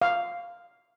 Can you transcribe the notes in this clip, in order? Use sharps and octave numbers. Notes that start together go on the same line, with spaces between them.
F5